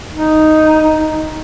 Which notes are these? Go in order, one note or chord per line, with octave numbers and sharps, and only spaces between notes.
D#4